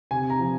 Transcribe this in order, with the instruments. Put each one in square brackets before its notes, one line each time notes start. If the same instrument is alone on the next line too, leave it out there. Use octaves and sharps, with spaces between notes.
[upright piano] C3 G#5
A#5
F3